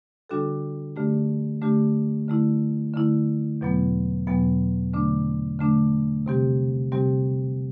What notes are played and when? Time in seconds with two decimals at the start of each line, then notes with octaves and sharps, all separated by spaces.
0.29 D3 G3 D4 F#4 A4
0.96 D3 A3 D4 G4
1.62 D3 A3 D4 G4
2.28 D3 A3 E4
2.94 D3 A3 E4
3.61 E2 B2 F#3 B3
4.27 E2 B2 F#3 B3
4.93 D3 A3 D4
5.59 D3 A3 D4
6.26 C3 G3 C4 G4
6.92 C3 G3 C4 G4